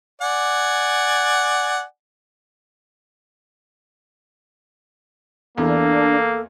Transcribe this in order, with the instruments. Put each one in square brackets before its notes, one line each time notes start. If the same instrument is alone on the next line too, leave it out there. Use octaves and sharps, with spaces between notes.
[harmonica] D5 F#5 G#5
[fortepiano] E2 [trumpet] A#3 [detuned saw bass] D4 [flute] A4